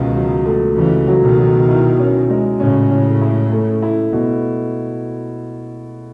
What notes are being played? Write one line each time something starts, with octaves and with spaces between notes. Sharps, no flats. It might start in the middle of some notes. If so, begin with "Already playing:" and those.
Already playing: C#2 B2 D#3
F#3
A3
C#2 C#3 E3
F#3
B2 D#3
F#3
E4
C#4
G#3
A2 C#3 C#4
C#4
E4
A3
E4
B2